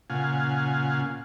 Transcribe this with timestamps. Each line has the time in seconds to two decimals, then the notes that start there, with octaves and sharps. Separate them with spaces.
0.10 A#2 C#3 F4 F5 F#5 G#5